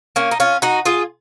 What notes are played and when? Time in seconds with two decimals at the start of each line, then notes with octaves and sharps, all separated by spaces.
0.16 A#3 C#4
0.31 D#4
0.40 C#4 F4
0.62 D#4 F#4
0.85 F4 G#4